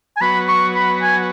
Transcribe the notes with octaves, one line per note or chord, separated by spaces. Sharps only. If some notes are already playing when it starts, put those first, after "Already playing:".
G#5
F#3 B3 F#4 B4 B5
C#6
B5
G#5